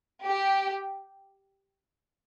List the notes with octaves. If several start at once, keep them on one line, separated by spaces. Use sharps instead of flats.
G4